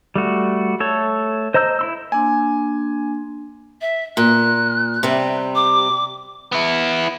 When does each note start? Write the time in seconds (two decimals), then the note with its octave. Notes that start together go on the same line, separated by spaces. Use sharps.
0.16 G3 A3 F#4
0.80 A3 A4 C#5
1.54 C5 D#5 A#5 E6 G6
1.79 E4 C6 E6
2.12 A#3 D4 G#5 C6
3.81 E5
4.17 A#2 F#6
5.03 C3 G3
5.55 D6
6.53 B3 E4